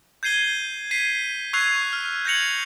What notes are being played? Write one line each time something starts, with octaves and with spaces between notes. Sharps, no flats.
G6 G#6 C7 D#7 G7
G#6 B6 C7 D#7
C#6 E6 F#6 G#6 C7 F7
F6
G6 G#6 A#6 C#7 F7 F#7